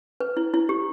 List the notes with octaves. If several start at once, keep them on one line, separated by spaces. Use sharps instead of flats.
B4
E4
E4
G4